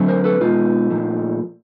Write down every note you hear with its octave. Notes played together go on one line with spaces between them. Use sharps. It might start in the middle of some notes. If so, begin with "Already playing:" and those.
Already playing: D3 F#3 A3 C4
A#4 C5
A4 B4
B2 G#3 B3 D#4 F4
A#2 F3 A3